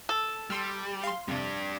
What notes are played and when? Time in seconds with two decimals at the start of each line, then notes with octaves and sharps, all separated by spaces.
0.09 A4
0.50 G3 C6 E6 F6
1.04 F5 C6
1.28 F2 C3 G3 D4